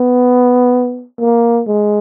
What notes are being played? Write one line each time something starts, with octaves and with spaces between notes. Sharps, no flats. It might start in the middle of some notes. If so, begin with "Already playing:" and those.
Already playing: B3
A#3
G#3